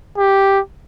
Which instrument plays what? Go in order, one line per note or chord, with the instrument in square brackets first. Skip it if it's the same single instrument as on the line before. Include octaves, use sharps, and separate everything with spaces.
[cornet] G4